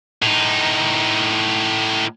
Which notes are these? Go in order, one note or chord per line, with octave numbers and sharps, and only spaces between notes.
A2 D#4